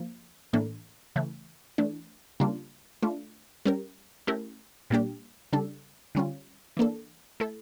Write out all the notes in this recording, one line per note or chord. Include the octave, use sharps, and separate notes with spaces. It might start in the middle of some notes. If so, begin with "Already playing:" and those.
Already playing: F3 A#3
A2 E3 A#3 D4 A4
C#3 E3 A3
E3 A3 D4
C#3 G3 A#3 D4 F4
A3 D4 F4
G3 C#4 G4 A#4
A3 C#4 E4 G4 A#4
A#2 G3 A#3 D4 G4
C#3 G3 D4 A4
D3 G3 C#4 F4
E3 A#3 D4 A4
A3 E4 A4